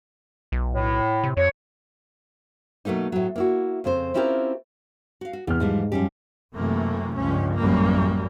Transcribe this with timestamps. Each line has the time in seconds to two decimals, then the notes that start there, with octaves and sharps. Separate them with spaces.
0.52 B1
0.72 A2
1.24 C3
1.37 F2 C#5
2.85 B2 F#3 A3 A#3 D#4
3.12 A2 F#3
3.36 A#3 E4 F#4
3.84 F2 C#3 C4 C5
4.14 C4 C#4 E4 F4 G4 A#4
5.21 F#4 F5
5.33 F#4
5.47 E2 C3 F6
5.60 G#2 E3 F3 G3
5.92 F#2 F3 G3 G4
6.54 F#2 C3 E3 A3 A#3
7.17 C#2 G2 F3 C#4
7.57 A1 F#2 E3 G3 A#3